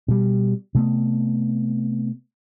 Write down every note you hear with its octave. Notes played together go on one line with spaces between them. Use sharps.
B2 G3
C3 A3 B3